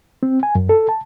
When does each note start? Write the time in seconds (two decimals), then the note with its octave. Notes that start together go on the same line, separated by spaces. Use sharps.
0.23 C4
0.43 G#5
0.55 F#2
0.69 A4
0.89 A5